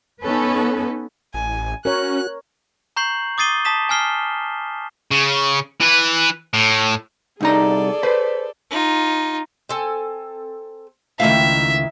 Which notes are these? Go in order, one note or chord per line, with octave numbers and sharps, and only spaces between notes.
B3 C#4 D#4 A4 B4
A1 G#5
C#4 F#4 A#4 C#5 F#6
A#5 C#6 G6 C7 F#7
D6 D#6 A6 C7 D#7 G7
A5 D#6 B6 E7
G#5 A5 F6 C7 G7
C#3
E3 B4
A2
C2 D#4 G#4 A4 D5 A#5
B4 C5
D#4 F4
C4 A4 G#5
C#2 D#3 A3 E4 E5 F5